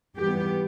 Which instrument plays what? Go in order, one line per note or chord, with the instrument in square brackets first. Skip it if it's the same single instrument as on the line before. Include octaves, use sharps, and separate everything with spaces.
[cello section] G#2 E3 G3 B3 G4